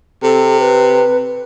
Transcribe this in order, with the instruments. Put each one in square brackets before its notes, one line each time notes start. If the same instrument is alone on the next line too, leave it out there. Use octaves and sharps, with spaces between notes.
[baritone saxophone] C3 [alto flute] A4
[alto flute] B4